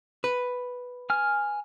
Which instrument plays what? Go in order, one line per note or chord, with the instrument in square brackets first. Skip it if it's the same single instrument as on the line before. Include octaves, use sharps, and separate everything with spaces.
[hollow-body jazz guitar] B4
[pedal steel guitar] G#5 F6